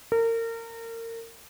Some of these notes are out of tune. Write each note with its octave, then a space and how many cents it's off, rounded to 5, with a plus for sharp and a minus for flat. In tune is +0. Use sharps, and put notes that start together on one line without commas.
A#4 -30